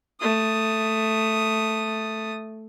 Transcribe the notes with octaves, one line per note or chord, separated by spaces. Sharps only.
A3 D#6